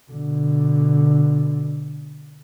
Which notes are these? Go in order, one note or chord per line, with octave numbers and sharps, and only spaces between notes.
B2 D3